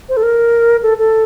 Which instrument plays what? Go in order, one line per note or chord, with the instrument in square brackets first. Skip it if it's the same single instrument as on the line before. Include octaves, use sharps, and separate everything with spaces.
[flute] C5
A4
A#4
A4
A4